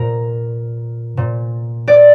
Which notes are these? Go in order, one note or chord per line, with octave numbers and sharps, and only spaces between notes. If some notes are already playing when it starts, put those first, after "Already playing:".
Already playing: A#2 A#4
A#2
D5